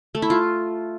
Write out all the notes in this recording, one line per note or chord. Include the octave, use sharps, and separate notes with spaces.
A3
E4
F4